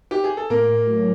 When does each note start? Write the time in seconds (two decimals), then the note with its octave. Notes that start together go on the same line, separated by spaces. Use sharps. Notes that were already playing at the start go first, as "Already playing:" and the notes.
0.11 G4
0.24 G#4
0.37 A4
0.50 A2 A#3 A#4
0.68 A2
0.87 F#3